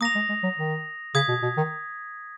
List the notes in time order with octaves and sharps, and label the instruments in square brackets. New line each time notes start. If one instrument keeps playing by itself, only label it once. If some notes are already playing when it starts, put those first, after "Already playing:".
[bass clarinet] A#3 [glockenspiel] D#6 A#6 F7
[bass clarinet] G#3
G#3
F#3
D#3
[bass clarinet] C#3 [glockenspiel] D#6 G#6 B6
[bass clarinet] B2
B2
D#3